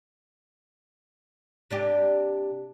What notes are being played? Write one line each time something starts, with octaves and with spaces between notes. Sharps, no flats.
C3 D4 G4